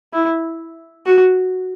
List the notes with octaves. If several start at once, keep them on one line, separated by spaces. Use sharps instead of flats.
E4
F#4